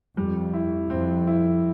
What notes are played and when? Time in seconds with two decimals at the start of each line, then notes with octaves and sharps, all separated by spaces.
0.17 F2 G3
0.53 E4
0.90 F2 C4
1.27 E4